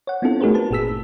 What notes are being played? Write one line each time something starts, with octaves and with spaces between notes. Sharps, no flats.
C#5 F#5
B3 C4 D4 E4 F4 A4
A3 D#4 F#4 G#4 A#4 C5
B4 A5
G1 A#2 G#4 E6 B6